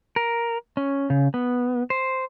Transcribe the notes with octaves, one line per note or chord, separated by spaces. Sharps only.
A#4
C#4
C#3
B3
C5